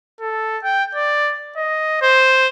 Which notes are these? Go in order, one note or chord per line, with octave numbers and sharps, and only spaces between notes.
A4
G5
D5
D#5
C5